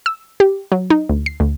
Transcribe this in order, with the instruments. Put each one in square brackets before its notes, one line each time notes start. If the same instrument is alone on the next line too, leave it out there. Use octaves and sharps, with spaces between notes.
[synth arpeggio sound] E6
G4
F#3
D#4
D2
C7
D2